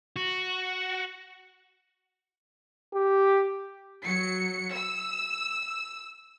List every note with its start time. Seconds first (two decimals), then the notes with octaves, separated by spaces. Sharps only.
0.16 F#4
2.94 G4
4.04 F#3 C#7
4.74 E6